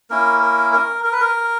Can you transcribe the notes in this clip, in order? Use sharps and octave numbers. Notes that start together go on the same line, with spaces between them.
A#3 C#4 E4 A#4
A#4
A#4
A#4
B4
A#4